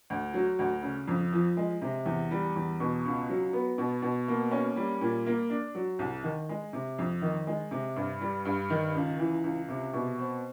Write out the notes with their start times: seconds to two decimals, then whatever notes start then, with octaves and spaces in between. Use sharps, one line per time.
0.10 D2
0.34 F#3
0.59 D2
0.83 C#3
1.07 F2
1.33 F3
1.57 G#3
1.82 C3
2.06 E2
2.31 G3
2.56 E2
2.80 B2
3.05 C#2
3.29 F#3
3.53 B3
3.78 B2
4.02 B2
4.28 A#3
4.51 C#4
4.76 G3
5.01 A#2
5.26 A#3
5.50 D4
5.75 F#3
5.99 C2
6.24 D#3
6.49 G#3
6.73 C3
6.99 F2
7.22 D#3
7.47 G#3
7.71 C3
7.96 G2
8.21 G3
8.45 G2
8.70 D#3
8.95 C#2
9.19 E3
9.44 C#2
9.69 C3
9.93 B2
10.18 C4